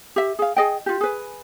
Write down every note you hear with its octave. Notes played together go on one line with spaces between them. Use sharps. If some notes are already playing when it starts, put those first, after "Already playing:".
G4 E5
G#4 F5
G#4 D#5 G5
F4 G4
G#4 B4